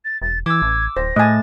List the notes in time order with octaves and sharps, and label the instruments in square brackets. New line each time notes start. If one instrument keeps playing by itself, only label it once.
[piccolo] A6
[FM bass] E1 [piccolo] A6
[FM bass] E3 [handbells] D6 E6 [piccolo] G#6
[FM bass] A1
[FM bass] D1 [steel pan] C5 [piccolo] A#6
[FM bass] A2 [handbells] A3 A5 A6 [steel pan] D#5 G#5